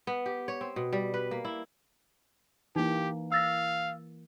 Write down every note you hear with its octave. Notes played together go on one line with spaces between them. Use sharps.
B3
G4
C#5
C4
B2
G3
B4
A#3
E4
E3 A#3 D#4 G4
F5 E6 A6 A#6